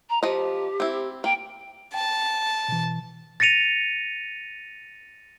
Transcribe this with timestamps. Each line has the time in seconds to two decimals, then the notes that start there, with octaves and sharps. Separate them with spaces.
0.09 A#5
0.23 F3 G4 D#5
0.80 C4 E4
1.24 A#3 G5
1.94 G5 A5
2.69 B2 E3
3.40 A6 A#6 C#7 D#7 F7